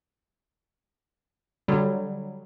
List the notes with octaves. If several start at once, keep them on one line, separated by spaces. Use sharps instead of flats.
D3 F#3 G3